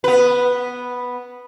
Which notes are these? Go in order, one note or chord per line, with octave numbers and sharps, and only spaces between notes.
B3 B4